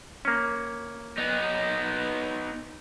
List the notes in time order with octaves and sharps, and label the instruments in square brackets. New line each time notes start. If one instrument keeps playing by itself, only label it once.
[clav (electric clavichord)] A#3 C#4
[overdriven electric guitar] B3 D#4